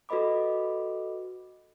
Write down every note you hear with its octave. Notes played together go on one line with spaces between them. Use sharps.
F#4 A4 B4 D#5 B5 D6